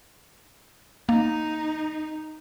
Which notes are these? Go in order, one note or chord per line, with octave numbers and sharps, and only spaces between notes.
A#3 D#4